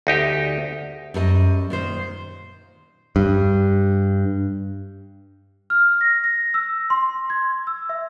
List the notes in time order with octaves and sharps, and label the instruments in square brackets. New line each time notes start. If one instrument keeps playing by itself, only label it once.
[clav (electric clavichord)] D2 D#4 G4
[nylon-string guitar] F#2 G3 A4 D#5
A#2 D#3 C5
[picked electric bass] G2
[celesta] F6
A#6
A#6
E6
C6
G#6
E6
E5